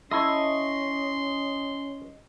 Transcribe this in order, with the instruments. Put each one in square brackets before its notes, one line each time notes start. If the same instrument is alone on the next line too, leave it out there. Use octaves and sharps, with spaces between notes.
[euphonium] C#4 [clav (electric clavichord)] E4 A4 [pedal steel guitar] D#5 C#6 [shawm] C6